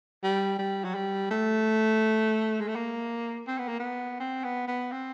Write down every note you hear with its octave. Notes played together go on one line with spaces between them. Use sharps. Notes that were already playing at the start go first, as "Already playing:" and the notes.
G3
G3
F#3
G3
A3
G#3
A3
A#3
C4
B3
A#3
B3
C4
B3
B3
C4